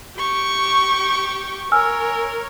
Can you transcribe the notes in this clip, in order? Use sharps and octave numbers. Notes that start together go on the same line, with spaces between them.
G4 C#6
A#4 C#5 G#5 E6 F6